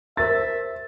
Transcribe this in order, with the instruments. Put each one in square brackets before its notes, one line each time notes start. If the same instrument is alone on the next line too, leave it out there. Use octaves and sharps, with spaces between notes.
[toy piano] G4 A#4 C5 [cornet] E5 [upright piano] A6